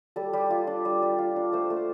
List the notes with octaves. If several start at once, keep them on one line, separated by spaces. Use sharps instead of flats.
G3 A4
G3
F4
D4
G3
G3
F4
D4
A3 C5
A3
C5